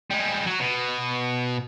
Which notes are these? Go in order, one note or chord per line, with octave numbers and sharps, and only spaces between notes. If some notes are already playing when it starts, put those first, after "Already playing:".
G3 G#3
F#3 F#4
B2